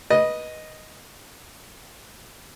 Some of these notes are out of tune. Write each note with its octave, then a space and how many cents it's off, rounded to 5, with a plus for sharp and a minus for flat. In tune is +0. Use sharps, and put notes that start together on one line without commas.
B4 -20 D#5 +0